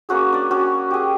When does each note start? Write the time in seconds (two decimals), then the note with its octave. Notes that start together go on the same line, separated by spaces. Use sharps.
0.09 A#3 C#4 F#4 G#4
0.33 D4 D5
0.51 C#4 F#4
0.91 G4 G#4